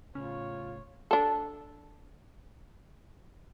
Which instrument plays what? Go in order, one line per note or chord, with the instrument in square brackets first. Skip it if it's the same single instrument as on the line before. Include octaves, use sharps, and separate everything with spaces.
[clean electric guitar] A2 C#3 [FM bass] C#4 [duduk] F4 [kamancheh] C#5
[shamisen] D4 A4